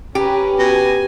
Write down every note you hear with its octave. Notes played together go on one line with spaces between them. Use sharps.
C#4 G4 B4 A#5
B2 G#5